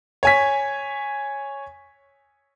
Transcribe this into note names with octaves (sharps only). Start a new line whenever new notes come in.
C#5 G#5 B6